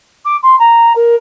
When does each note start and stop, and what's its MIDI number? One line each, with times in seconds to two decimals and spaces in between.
0.25 0.36 86
0.43 0.58 84
0.59 0.93 82
0.95 1.15 70